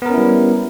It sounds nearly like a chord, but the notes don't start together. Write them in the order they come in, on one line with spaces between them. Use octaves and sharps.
B3 A#4 C#4 E4 G3